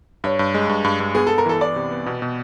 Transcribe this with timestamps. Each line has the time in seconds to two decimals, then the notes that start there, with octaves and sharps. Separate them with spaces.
0.24 G2 C#5
0.39 G2
0.54 G#3
0.69 G2
0.85 G2
1.00 G2
1.15 B3 G#4
1.27 B3 A4
1.38 A#4
1.46 E3 A4
1.61 E3 D5
1.76 C3
1.91 B3
2.06 B2
2.22 B2